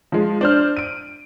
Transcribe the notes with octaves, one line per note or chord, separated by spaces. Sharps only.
F3 G#3
D4 C5 F6
D7 D#7